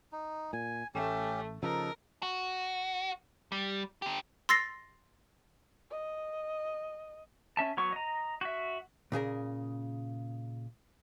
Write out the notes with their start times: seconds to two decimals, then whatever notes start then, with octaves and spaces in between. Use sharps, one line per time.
0.12 D#4
0.53 A#2 G#5
0.95 A1 A3 C#4 G4
1.63 C#3 F3 D#4 A4 A#4
2.23 F#4
3.52 G3
4.02 D3 G4
4.49 C6 E6 A6 A#6 C7
5.91 D#5
7.57 C#4 E5 A5
7.77 F#3 B3 C#6
7.92 D#5 A#5
8.41 F#4 E5
9.12 A#2 C#3 G#4 A#4